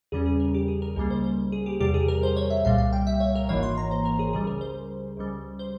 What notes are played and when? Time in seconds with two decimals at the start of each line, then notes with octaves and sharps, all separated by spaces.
0.12 E2 C#3 G3 C#4 G#4
0.26 G#4
0.40 A#4
0.54 G4
0.68 G#4
0.82 A#4
0.96 C#2 C#3 G3 A#3 A#4
1.10 C5
1.24 C5
1.52 G#4
1.66 G4
1.80 E2 C3 G3 G4
1.94 G#4
2.08 A#4
2.23 C5
2.36 C#5
2.50 E5
2.65 C2 A#2 G3 F5
2.78 F5
2.93 G5
3.07 E5
3.20 C#5
3.35 A#4
3.49 G#1 G#2 E3 A#3 C#5
3.63 C6
3.77 A#5
3.91 C5
4.05 A#4
4.19 G#4
4.33 C#2 C#3 G3 G#4
4.47 A#4
4.61 C5
5.17 C#2 C#3 G3
5.59 C5